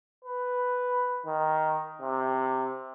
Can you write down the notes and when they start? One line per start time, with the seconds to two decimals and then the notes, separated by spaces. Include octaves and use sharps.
0.25 B4
1.26 D#3
2.01 C3